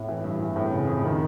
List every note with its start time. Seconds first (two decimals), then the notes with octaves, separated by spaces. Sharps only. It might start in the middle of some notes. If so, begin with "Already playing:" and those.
Already playing: A2
0.08 E3
0.24 G2
0.41 E3
0.56 A2
0.72 C#3
0.88 F2
1.04 D#3